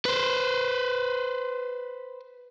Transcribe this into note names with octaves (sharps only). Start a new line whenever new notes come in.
B4 C5